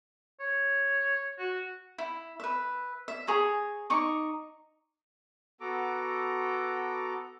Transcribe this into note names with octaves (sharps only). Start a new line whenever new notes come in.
C#5
F#4
E4
B4 E5
E5
G#4 C#5 A#5
D#4 C#6 D6
B3 F#4 A4 A#5 D6